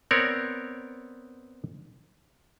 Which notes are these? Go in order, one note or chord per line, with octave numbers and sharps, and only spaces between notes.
B3 C4 A#4 C#5 D5